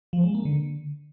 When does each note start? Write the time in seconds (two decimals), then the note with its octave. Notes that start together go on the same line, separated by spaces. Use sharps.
0.13 F3
0.24 G#3
0.34 A#3
0.45 D3